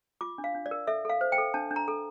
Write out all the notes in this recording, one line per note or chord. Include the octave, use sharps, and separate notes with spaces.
F4 D6
D4
F5
D4
D5
A#4
A4 E5
A4 F5
C5
G5
A4
D4 A5
D4
A#5
A4